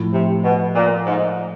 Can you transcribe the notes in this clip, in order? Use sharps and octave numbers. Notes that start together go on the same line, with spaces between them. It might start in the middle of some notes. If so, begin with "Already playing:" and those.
Already playing: A2 F3 A3
C3
B2
A#2
G#2